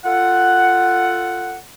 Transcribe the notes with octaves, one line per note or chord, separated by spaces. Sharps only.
F4 A4 F#5